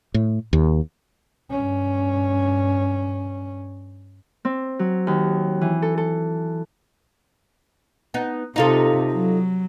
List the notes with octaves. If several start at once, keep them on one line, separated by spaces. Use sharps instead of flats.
A2
D#2
G2 C#4
C4
F#3
D#2
E3
A4
A4
B3 D#4
C3 D#4 F4 A4
F#3